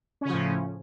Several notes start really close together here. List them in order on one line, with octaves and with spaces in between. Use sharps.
C#4 C#3 F3 A2